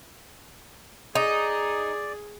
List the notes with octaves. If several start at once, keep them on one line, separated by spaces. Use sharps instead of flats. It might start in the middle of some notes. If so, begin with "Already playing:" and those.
D#4 G#4 D5